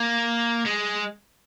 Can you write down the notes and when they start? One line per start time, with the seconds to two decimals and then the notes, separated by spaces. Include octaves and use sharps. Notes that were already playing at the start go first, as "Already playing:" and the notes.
Already playing: A#3
0.66 G#3